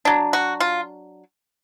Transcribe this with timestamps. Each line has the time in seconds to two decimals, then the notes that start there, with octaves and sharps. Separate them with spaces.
0.05 F#3 D4
0.33 F#4
0.60 F4